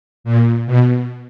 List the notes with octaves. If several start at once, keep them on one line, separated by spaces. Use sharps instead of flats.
A#2
B2